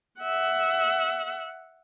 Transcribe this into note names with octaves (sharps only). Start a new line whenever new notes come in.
E5 F#5